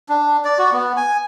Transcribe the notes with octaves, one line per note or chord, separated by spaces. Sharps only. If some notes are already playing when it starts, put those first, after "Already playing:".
D4
D5
F#4
B3
G#5